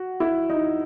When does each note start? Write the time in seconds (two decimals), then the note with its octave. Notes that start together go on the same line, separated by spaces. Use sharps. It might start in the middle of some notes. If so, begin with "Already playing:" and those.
Already playing: F#4
0.20 E4
0.50 D#4